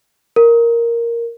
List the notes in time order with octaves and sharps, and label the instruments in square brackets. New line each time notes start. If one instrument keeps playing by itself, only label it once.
[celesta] A#4